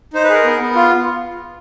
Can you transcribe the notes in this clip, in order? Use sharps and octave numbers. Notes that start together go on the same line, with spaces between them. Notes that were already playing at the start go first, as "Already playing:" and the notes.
D#4 C5
B4
G#4 A#4
B3
B3
F4